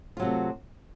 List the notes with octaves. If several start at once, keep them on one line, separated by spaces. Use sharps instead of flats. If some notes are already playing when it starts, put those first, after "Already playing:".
C3 F#3 A3 F4